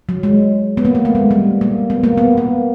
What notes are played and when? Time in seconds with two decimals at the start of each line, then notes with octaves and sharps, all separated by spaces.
0.09 F#3
0.23 G#3
0.77 B3
0.85 A#3
0.95 A#3
1.05 A3
1.15 G#3
1.31 G3
1.61 A#3
1.90 B3
2.04 A#3
2.18 B3
2.38 A#3